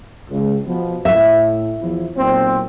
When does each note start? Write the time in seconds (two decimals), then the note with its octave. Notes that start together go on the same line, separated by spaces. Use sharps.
0.30 C#2
0.66 B2 F3 B3
1.05 A2 E5
1.81 E2 F3 E4
2.17 B1 A#2 C4